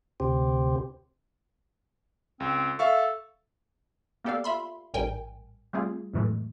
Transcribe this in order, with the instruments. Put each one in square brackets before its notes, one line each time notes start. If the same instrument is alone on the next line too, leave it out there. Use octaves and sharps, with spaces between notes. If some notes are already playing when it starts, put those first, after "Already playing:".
[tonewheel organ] D2 C3 G4 C5
[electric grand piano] C#2 [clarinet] C4
[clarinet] A4 [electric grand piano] E5 F5 C#6
[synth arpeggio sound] A#3 B3 G4 A4 D5 F5
F4 E5 B5 C6
A1 G#2 G3 A#4 G5 G#5
G3 A3 C4 F4 G#4
F2 A2 E3 F#3 G#3 A3